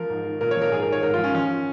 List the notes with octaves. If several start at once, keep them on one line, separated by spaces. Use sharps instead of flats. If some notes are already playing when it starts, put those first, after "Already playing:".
Already playing: F3 A#4
G#2
D#3
A#2 A#4
C#5
F3
A#4
G#2 G#4
A#4
D#3 C#5
G#2 A#4
F3 F4
C#4
F3 C#4